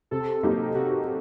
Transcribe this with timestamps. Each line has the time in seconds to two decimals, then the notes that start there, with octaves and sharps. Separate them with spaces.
0.11 C3 A4
0.43 F#3 A#3 D#4 G4
0.75 C3 F#4